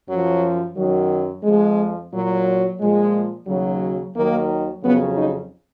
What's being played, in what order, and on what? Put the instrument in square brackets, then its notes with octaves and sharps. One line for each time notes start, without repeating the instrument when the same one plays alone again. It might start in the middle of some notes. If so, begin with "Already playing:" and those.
[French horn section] F#2 F3 F#3
F#2 D#3 F#3
F2 F3 G#3
A#2 F#3
A#2 F3 G#3
D#2 C#3 F#3
D#2 D#3 F#3 A#3
F2 C#3 F#3 B3
D#4